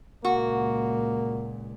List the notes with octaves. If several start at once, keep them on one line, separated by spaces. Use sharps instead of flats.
C#2 A#2 A#3 F#4